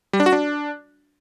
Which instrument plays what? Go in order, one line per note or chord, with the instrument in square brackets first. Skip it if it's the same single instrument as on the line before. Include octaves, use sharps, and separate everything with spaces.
[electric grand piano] G3
D4
F#4
D4